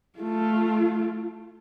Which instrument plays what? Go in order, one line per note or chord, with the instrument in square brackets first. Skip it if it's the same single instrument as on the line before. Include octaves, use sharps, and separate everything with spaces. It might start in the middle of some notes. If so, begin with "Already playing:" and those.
[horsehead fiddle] A3 F4